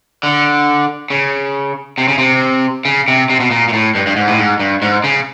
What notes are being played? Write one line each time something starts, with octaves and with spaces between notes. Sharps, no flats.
D3
C#3
C3
C#3
C3
C#3
C3
C3
B2
A#2
A#2
A2
G2
G2
G#2
A2
G#2
G2
G#2
C#3